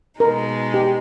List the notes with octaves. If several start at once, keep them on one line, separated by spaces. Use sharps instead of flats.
B2 G#3 D#4 A#4
G4